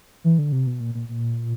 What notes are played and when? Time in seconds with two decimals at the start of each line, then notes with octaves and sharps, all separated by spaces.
0.24 E3
0.39 D3
0.52 C3
0.67 B2
0.80 A#2
0.95 A#2
1.09 A#2